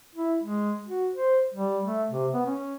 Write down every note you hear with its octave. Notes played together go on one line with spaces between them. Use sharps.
E4
G#3
F#4
C5
G3
A3
C3
B3
C#4